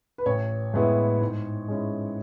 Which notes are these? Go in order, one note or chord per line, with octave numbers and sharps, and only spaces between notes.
B4
A1 C#5
A2 G#3 B3 E4
G#2
G#3 C#4 E4